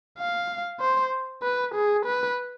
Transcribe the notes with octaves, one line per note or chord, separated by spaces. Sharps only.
F5
C5
B4
G#4
B4